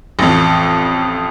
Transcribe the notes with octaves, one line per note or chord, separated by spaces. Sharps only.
A1 F2